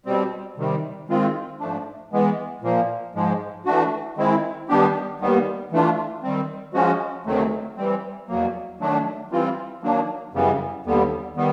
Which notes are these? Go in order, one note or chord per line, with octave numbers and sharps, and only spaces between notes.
B2 G3 C4
C3 D#3 G3
D#3 G#3 C4 F4
G#2 F3 A3 D4
E3 G#3 B3
A#2 F3 A#3
G#2 F3 G#3
E3 A3 D4 F#4
D#3 G#3 C4 E4
D#3 G3 B3 D4 G4
D#2 D#3 G3 B3
E3 A3 D4 F4
D#3 G3 C4
F3 G#3 C#4 F#4
D2 C3 D#3 F#3 A3
E3 G3 C4
E2 B2 F#3 A#3
D#3 F#3 A3 D4
E3 G3 C4 F4
D#3 F#3 A#3 D4
F#2 C#3 E3 G3 B3
D#2 D3 G3 B3
D#3 G3 B3